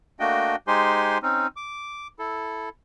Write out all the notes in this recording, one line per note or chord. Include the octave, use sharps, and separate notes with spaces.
A3 A#3 D4 F#4 D#5 G5
G#3 D#4 G4 C5 G#5 C6
C4 C#4 D#4
D6
E4 A4